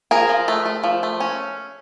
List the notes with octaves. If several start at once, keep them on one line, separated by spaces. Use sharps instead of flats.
F3 G#4 A#4
F3
A3
A3
F3
A3
C#4